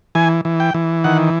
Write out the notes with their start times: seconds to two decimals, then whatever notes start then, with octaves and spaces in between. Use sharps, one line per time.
0.15 E3 G#5
0.45 E3
0.60 G5
0.74 E3
1.04 D#3 F#5